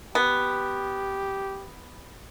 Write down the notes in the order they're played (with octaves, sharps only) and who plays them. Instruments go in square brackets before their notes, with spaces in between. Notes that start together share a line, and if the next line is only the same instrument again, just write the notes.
[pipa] B3 [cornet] G4